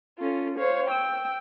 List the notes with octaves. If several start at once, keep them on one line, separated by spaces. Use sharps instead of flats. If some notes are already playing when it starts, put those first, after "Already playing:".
C#4 F4 A4
C5 C#5 F5
G5 E6